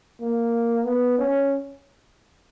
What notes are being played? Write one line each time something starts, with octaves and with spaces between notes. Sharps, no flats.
A#3
B3
C#4